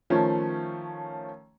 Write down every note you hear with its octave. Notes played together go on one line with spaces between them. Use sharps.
D#3 F3 A3 C#4